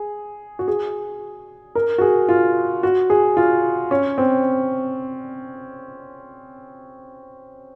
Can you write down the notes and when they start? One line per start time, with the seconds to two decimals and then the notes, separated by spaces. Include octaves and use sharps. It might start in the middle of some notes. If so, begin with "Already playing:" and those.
Already playing: G#4
0.59 F#4
0.68 G#4
1.75 A#4
1.98 F#4
2.01 G#4
2.29 F4
2.83 F#4
3.10 G#4
3.37 F4
3.91 C#4
4.18 C4